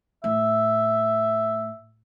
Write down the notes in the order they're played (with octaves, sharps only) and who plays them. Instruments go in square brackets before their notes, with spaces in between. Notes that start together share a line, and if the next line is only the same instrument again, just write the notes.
[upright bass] A2 [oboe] E5